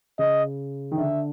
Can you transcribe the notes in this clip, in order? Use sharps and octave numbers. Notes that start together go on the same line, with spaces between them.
C#3 D#5
D#3
D3 E5